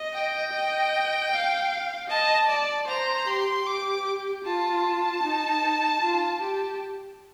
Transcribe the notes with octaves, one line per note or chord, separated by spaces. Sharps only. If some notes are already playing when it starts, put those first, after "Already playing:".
Already playing: D#5
G5
D#5
F5
D#5 A5
D5
C5 A#5
G4 C6
G4 D6
F4 A5
D#4
F4
G4